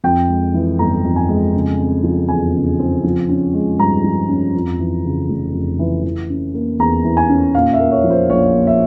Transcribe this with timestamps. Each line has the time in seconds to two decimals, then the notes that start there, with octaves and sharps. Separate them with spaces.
0.04 F2 G5
0.29 G#3
0.54 E3
0.79 G1 A#5
1.05 F2
1.16 G#5
1.28 G#3
1.54 C#3
1.79 C4
2.03 F3
2.29 E2 G#5
2.55 C#3
2.79 C4
3.04 F3
3.29 C#4
3.54 G#3
3.79 G2 A#5
4.04 F3
4.29 C#4
4.55 F2
4.79 E3
5.05 C#3
5.29 F1
5.54 F2
5.79 E3
6.04 E3
6.30 C#4
6.54 A#3
6.79 E2 A#5
7.04 E3
7.17 G#5
7.29 C#4
7.54 A#2 F5
7.73 E5
7.79 A#3
7.91 C#5
8.04 F3
8.10 C5
8.30 A#1 C#5
8.54 A#2
8.67 E5